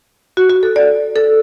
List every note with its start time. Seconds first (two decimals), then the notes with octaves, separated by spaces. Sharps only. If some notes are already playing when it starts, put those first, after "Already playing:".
0.37 F#4
0.50 F#4
0.63 A4
0.76 D5
1.16 A4